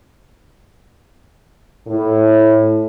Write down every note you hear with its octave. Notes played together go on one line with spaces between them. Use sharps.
A2